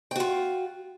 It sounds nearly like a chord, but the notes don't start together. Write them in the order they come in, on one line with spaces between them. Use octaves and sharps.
G5 F#4 F4